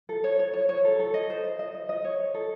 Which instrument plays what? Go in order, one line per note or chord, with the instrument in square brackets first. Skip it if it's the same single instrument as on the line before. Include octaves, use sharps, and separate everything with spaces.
[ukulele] A4
C#5
C#5
C#5
C#5
A4
A4
D#5
C5
D#5
D#5
D#5
D#5
C#5
C#5
A4